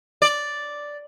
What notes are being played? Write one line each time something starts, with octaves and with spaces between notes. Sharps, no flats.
D5